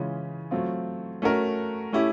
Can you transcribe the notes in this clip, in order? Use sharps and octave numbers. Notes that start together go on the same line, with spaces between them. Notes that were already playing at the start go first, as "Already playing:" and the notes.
Already playing: C#3 E3 G#3 C#4 F4
F#3 A3 C4 F4
A3 C#4 F#4 A#4
A3 C#4 E4 G4